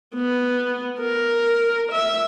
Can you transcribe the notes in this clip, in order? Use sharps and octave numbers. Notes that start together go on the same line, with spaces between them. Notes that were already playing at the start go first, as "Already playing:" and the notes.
B3
A#4
E5